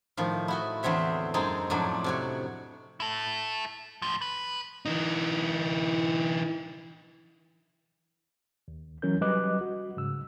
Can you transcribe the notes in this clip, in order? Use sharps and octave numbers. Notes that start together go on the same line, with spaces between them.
A2 D#3 F3
E4 F#4 D#5
E2 D3 C4 C#5 E5
F#2 G#3 C4 D#4 G#5 A5
F2 A2 F#3 D4
C3 F#4 C#5
E4 A4
A2 F3
B4
E3 D#4
D#2
E3 F#3 C#4 A#4 G6
F#3 G3 B4 D#5 D6 F#6
F#4
G#2 C#3 E6